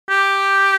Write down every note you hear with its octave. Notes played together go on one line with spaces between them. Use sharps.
G4